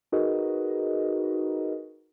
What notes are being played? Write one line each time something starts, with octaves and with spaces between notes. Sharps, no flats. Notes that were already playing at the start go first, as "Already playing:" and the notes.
D#4 F#4 G#4 A#4 B4 D#5